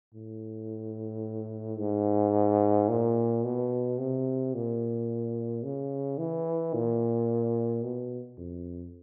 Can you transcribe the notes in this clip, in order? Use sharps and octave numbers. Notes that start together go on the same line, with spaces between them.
A2
G#2
A#2
B2
C3
A#2
C#3
E3
A#2
B2
F2